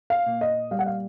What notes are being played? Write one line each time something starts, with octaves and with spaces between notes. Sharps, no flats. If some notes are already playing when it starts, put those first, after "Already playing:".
F5
A#2
D#5
G3 F5
F#5
F5